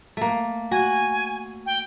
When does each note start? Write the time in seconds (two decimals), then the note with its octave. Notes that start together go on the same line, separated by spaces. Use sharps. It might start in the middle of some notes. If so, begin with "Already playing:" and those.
0.17 A3 A#3
0.71 F#4 G#5
1.66 G5